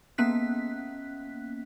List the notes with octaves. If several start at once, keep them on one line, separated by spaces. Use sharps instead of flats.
A#3 B3 C#4 F#6 B6